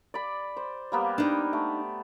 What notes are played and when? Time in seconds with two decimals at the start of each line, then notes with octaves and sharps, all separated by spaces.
0.14 D5 B5
0.57 C5
0.92 G3 A#3 B3
1.18 D4 D#4 G5
1.53 A3